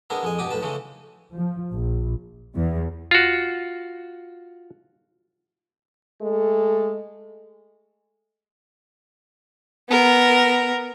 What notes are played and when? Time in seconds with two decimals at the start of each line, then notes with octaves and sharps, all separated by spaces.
0.10 G#3 B3 D4 E4 A#4
0.23 F2 G#3 G#5
0.39 G2 B2 G4 D6 D#6
0.51 B1 A2 B4 A5
0.62 C#3 E3 G#3 A3
1.35 F3
1.72 A#1
2.56 E2
3.11 F4 F#4
6.22 G#3 A3 A4
9.89 B3 A#4